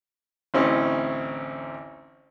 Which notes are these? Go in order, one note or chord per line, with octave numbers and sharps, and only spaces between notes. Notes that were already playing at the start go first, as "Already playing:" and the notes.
A1 D2 C4 C#4 D#4 E4